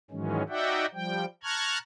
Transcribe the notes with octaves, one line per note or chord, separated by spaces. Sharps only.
G#2 D#3 E3 F#3 G#3 C#4
D#4 F#4 D5 E5 F#5 G5
F3 G3 G5
A5 A#5 C#6 F6 F#6 G#6